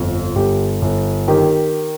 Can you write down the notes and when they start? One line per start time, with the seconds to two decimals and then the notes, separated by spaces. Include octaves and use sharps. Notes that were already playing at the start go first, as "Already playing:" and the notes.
Already playing: G1 F2
0.36 G1 G4
0.82 G1
1.28 D#3 G4